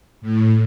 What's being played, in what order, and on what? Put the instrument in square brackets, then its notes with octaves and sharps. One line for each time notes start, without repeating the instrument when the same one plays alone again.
[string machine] A2